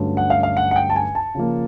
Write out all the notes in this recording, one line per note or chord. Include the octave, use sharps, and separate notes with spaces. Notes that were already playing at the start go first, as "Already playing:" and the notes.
Already playing: G2 D3 F#3 A3 C#4
F#5
F5
F5
F#5
F#5
G5
A5
G#5
A5
C#3 F3 A#3